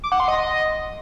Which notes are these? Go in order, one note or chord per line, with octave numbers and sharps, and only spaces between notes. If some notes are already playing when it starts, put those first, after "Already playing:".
D6
F#5
C6
D#5